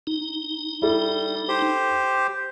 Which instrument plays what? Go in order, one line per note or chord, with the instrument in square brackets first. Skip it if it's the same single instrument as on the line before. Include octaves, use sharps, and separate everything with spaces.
[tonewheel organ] D#4
[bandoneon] G3 [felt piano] E4 A4
[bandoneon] G4 C5